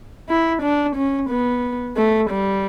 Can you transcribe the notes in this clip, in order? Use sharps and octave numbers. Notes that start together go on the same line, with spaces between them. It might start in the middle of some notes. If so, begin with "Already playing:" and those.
E4
D4
C#4
B3
A3
G3